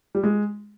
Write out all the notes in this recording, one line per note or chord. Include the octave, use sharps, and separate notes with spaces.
G3
G#3